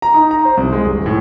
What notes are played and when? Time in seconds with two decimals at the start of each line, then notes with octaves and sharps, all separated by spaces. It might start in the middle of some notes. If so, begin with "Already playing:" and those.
0.02 A#5
0.14 D#4
0.31 A#5
0.45 C5
0.57 C2
0.73 G#3
0.86 D#1
1.06 A2